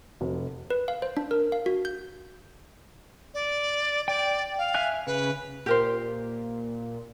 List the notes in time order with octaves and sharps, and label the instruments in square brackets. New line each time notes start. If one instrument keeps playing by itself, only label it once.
[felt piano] F1
[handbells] B4
F5
C5
D4
A#4
F5
F#4
G6
[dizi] D5
[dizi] D5 [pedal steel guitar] G5
[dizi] F5
[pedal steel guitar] E5 G#5 F#6
[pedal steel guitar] C#3 [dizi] B4
[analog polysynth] A#2 [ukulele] G4 A#4 C5